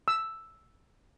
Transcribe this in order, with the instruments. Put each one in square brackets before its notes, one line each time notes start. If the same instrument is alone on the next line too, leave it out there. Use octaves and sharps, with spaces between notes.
[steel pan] E6